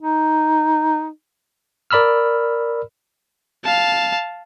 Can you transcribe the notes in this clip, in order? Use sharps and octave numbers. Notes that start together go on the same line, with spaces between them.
D#4
A#4 D5 B5 E6 F6
F5 A5